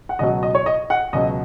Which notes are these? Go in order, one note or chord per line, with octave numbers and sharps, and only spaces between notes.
F#5
C#2 B2 F#3 D#5
D#5
C#5
D#5
F#5
C#2 B2 F#3 D#5